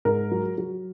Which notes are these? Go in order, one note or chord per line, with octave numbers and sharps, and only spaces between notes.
G#2 A#4
F#3
F#3